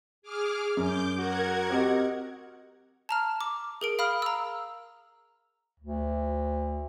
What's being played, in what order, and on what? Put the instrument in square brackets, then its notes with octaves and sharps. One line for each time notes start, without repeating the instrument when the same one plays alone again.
[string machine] G#4 D6 F6
[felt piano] F#2 [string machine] D6 G6
[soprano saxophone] F#4 [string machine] A#4 F#5 G#6
[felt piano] C4 G4 D#5
[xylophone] A5 A#5 F6
D6
G#4 A#4 D7
F5 B5 D#6 F6
A#5 E6
[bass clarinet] D2